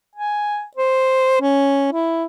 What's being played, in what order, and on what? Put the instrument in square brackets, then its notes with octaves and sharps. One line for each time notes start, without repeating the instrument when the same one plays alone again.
[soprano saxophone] G#5
C5
C#4
E4